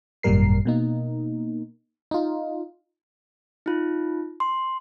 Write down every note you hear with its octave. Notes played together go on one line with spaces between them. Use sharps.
G#1 F#2 A#2 G3 A#4 C7
B2 A#3 D#4
D#4 F4
D#4 F4
C6